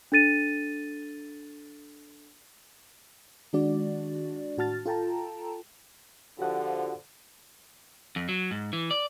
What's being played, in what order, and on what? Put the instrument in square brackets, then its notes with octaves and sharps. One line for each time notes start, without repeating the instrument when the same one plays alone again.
[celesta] D4 A4 A6 D#7
[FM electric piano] D#3 G#3 D4 F#4 D5
A2 F#4 A5 F6 A6
F4 A4 G5 A5 A#5
[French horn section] D3 F3 [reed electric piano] F#4 G4 F#5
[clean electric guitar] F2
F#3
G#2
E3
D5